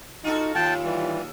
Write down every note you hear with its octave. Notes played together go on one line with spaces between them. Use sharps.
D#4 F4 F#4 A4
D#2 F4 G5 A5
E3 G3